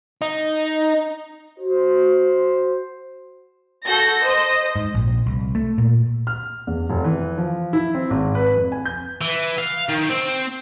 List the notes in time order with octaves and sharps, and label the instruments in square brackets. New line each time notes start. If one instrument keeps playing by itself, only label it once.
[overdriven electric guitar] D#4
[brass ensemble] F#4 C5
[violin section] F#4 A4 G6 A#6
C5 D#5
[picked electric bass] G#2
A#1
C2
A3
A#2
[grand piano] F6
E2
F1
E3
F3
E4
C4
G#1
B4
F2
G#5
G6
[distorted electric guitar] E3
F5
D#3
C4